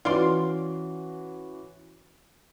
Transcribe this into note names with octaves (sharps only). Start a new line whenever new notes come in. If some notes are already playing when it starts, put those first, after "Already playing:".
E3 C#4 F4 F#4 D5 C6